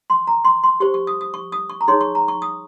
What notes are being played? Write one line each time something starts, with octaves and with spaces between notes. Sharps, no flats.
C6
A#5
C6
C6
G4 C5 C#6
C#6
D#6
D#6
C#6
D#6
C#6
A#5
D#4 G#4 C#5 C6
C#6
A#5
C#6
D#6